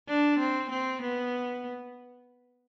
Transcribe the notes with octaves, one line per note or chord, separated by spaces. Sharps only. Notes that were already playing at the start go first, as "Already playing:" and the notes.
D4
C4
C4
B3